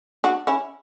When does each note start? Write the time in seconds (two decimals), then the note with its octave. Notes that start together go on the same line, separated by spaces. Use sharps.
0.24 D4 F#4
0.47 C#4 E4